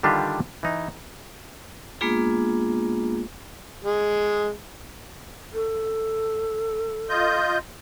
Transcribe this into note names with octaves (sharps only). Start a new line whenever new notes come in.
D3 D#3 G3 D4 F4 G4
E3 D#4
G#3 A#3 B3 D4 F4 G#4
G#3
A4
F4 D#5 G6